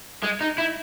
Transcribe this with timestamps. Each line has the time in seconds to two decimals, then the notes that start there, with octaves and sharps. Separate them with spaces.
0.23 G#3
0.41 D#4
0.58 E4